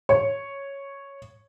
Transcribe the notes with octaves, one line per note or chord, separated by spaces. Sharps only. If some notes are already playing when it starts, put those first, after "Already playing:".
C#5